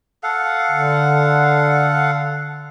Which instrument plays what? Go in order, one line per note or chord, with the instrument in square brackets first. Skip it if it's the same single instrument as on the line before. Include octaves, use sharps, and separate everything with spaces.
[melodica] A4 F5 F#5
[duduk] D3